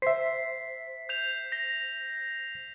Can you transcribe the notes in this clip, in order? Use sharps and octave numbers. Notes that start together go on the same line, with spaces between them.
C5 E5 B6 C7
G6 F7
A#6